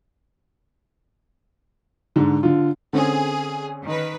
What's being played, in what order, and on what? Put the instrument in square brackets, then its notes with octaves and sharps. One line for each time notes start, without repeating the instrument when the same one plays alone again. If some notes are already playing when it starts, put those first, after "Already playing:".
[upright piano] G#2 D3
D3 F4
[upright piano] D3 C4 C#4 [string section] G#4
[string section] D#3 B4